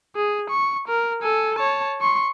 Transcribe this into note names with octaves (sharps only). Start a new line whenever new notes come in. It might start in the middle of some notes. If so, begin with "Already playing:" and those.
G#4
C#6
A#4
A4 G#5
C#5 A5
C6 C#6